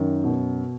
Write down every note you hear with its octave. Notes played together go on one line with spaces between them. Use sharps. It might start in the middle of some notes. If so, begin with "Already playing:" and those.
Already playing: F#2 D#3
B2